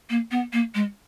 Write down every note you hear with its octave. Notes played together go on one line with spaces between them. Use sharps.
A#3
B3
A#3
G#3